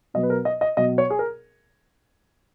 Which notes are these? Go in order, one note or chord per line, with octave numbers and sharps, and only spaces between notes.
B2 F#3 B3 D#5
B4
A#4
D#5
D#5
B2 F#3 B3 D#5
C#5
G#4
A#4